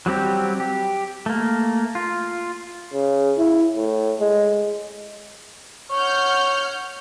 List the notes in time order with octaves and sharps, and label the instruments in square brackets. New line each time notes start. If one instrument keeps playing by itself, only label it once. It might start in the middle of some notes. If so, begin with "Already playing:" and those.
[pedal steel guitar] F#3 G3 C4 G4
G4
A3 A#3
F4
[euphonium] C#3
E4
A2
G#3
[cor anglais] C#5 [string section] F#5 F6 G6